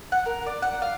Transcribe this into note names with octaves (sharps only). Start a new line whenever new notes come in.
F#5
A#4
D5
F#5
F5